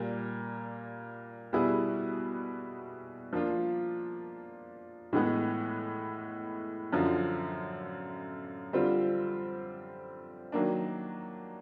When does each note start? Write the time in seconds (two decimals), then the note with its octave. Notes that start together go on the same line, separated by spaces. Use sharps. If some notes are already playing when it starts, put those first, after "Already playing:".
Already playing: A#2 G3 A#3
1.53 B2 G3 B3 E4 G#4
3.33 F3 A#3 D4 F4
5.13 A2 E3 G#3 B3
6.93 F#2 D3 F3
8.73 D3 G3 C4 F4
10.52 D#3 F#3 A#3 D4